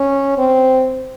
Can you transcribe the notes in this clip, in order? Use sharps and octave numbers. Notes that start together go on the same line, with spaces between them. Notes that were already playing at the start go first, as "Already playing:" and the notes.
Already playing: C#4
C4